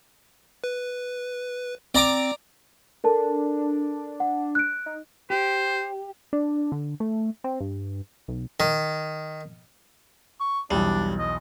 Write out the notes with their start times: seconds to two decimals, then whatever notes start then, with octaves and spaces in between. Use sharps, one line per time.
0.64 B4
1.95 C4 D5 A#5 D6
3.04 D4 A4 A#4 A5
4.20 F#5
4.55 F#6 D7
4.86 D#4
5.30 G4 C5
6.33 D4
6.72 D3
7.00 A3
7.44 C4
7.60 G2
8.28 B1
8.60 D#3
10.40 C#6
10.71 B1 E2 G3 D4
11.19 D#5